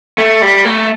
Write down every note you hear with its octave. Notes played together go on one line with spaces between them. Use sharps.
A3
G3
A3